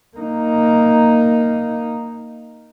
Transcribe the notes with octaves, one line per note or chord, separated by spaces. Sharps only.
A#3 D#4